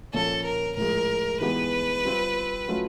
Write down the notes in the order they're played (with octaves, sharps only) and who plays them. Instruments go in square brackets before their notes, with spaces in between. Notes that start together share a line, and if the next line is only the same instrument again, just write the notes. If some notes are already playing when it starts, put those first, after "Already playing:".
[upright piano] A#2 F3 A#3 C#4 [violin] A4
[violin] A#4
[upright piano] A2 F3 G#3 [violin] A#4
[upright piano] E3 G#3 B3 D#4 G4 [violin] B4
[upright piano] G3 C4 F4
F#3 A3 C#4 F4